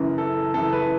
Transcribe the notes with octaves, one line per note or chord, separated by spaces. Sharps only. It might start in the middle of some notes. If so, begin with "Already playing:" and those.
Already playing: F#2 C#3 E3
A4
F#2 C#3 E3 A4
B4